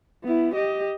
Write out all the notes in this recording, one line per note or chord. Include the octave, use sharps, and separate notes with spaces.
B3 E4
G4 D#5